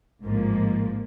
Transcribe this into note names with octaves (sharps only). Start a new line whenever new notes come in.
A1 G#2 F3 A#3